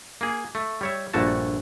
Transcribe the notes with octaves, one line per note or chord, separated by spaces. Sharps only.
A#3 G#4
A3
G3 C#5 E5
A#1 G2 A#2 A3 F#4 A5